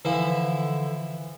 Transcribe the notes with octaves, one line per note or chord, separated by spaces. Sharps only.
D3 E3 F3 E4